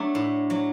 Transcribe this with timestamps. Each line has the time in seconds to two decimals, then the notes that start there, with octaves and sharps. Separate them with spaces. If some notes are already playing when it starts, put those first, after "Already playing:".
Already playing: F#3 A3 D4
0.15 A2
0.50 F#3